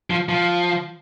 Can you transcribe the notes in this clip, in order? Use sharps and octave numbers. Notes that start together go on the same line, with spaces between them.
F3
F3